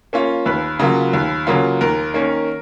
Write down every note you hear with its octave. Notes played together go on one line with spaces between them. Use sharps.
A#3 C#4 F4
D#2 B4
C#3 F#3 A#3 F4
D#2
C#3 F#3 A#3 F4
D#2 A#4
D#3 A#3 C#4